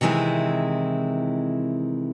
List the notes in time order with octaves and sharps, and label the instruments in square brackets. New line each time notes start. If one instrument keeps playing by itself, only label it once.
[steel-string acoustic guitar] C3 D#3 E3 G#3 C4 E4